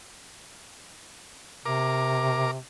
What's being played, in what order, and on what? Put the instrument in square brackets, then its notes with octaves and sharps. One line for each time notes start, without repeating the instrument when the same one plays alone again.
[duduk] C3 [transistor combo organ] A#4 D6